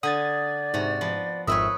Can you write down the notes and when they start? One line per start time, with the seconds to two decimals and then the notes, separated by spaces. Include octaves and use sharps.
0.03 D3 D5 F#5 D#6 G#6 A6
0.74 G#2 C3 F#4 A#5
1.01 F3 B3
1.47 G#1 F2 A#4 B4 C#5 E5 D#6